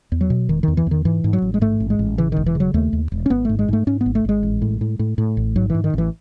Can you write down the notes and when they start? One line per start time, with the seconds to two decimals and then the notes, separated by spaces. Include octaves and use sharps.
0.12 E2
0.21 F#3
0.30 B2
0.49 E1 D#3
0.63 E2 D#3
0.77 E3
0.87 E2 D#3
1.05 G#2 E3
1.24 G#2
1.33 F#3
1.42 A1
1.54 G#3
1.61 G#2 A3
1.80 A1
1.90 G#3
1.99 A1
2.18 C#3 E3
2.32 E1 D#3
2.46 E3
2.55 C#3
2.60 F#3
2.74 D#2 A3
2.93 D#2
3.12 E1
3.26 C#4
3.30 G#1 B3
3.45 G#2 A3
3.59 G#3
3.68 G#2 A3
3.87 G#2 C#4
4.01 B3
4.06 G#1
4.15 A3
4.25 G#1 G#3
4.43 A1
4.62 A2
4.81 A2
4.99 A2
5.18 A2
5.37 A1
5.56 G#2 F#3
5.70 G#2 E3
5.84 D#3
5.94 A1 E3